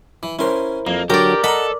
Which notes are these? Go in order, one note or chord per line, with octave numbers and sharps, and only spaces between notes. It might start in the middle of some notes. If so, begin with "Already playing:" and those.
E3
C#4 E4 A#4 C5 C6
F2 A#3
D3 F#3 F#4 G4 A#4 D5
A4 D#5 F#5 A#5 B5